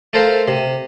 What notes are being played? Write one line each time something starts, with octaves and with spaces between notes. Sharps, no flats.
A3 A4 A#4 C5 F5
C3